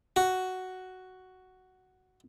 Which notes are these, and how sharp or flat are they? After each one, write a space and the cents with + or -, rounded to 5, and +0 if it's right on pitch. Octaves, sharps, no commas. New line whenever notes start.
F#4 +5